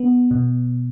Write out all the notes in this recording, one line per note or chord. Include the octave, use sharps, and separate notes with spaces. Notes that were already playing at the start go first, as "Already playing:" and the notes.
Already playing: B3
B2